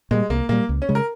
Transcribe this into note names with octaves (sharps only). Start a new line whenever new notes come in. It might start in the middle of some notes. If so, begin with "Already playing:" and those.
A#2 G3 G#3
C2 A#3
A#2 G3 A#3
C#2
C#4
C#3 G#3
A#4